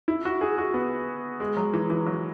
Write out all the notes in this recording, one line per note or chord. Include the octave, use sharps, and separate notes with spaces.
E4
F#4
G#4
F#4
B3
G#3
F#3
E3
E3
F#3